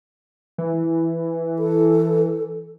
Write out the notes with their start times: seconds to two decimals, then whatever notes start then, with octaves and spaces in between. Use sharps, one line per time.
0.58 E3
1.59 A4